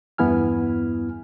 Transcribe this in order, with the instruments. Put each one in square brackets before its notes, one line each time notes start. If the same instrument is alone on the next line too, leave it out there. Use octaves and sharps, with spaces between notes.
[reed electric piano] E2 G2 B3 E4 G#5 F6